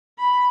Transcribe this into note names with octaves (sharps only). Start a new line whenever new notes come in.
B5